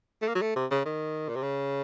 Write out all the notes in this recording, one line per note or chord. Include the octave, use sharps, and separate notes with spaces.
A3
A#3
F#3
A3
C3
C#3
D#3
A#2
C3
C#3